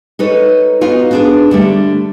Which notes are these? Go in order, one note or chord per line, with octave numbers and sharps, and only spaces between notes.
D#4 A4 B4 C#5
B3 D#4 F4 F#4
B3 D4 G#4
D3 G3 A3